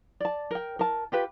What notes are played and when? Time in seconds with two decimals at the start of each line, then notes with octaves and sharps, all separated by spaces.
0.20 D5 A5
0.51 A#4 G5
0.79 A#4 A5
1.12 F4 G4 B4